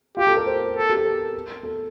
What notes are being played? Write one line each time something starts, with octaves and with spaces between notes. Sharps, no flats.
F4 G4
A4
A#4
C5
A4
G4
A4
A#4
A4